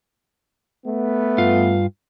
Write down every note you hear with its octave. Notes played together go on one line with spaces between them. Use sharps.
A3 B3
G2 F4 F5